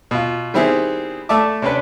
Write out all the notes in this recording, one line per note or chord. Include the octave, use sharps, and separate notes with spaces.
B2 F4
D#3 G3 B3 C4 E4 G#4
A3 D5 E5 A5 D6
C3 C#4 D4 B4